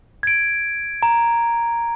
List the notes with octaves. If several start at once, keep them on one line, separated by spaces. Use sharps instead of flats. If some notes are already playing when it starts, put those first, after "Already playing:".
G#6 D7
A#5